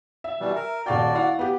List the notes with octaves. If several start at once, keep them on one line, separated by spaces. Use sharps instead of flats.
E5
B2 E3 G3
A#4
D#1 F#4 D5 F5 G5
E4 F5 F#5
B3 G4